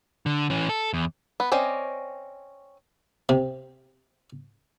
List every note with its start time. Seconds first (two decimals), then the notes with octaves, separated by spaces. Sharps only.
0.26 D3
0.50 E3 C#4
0.69 A4
0.93 E2
1.40 B3
1.52 C4 C#4 D5 D#5
3.29 C3